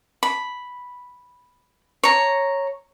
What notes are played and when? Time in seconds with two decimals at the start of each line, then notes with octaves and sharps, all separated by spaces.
0.23 B5
2.03 C#5 A#5